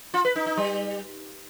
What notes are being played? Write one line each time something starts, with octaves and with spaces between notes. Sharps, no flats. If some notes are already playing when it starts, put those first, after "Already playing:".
F4
B4
D#4
D#4
G3